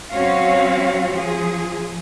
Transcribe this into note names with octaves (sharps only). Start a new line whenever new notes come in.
F#3 C4 C#4 F#4 C#5 F5
F3 G#4